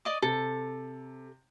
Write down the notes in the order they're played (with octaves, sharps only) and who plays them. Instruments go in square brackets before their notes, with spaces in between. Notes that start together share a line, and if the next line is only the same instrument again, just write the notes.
[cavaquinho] D5 D#5 D6
[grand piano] C3 [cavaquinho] A4